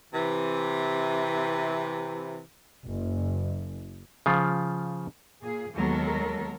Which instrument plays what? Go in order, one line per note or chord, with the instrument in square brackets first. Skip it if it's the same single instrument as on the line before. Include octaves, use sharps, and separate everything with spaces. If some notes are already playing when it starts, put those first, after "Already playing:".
[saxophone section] C3 E3
[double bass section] F#1
[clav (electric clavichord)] C#3 F3 F4
[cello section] A#2 G#4
D#2 F#3 G#3 B3 A4 A#4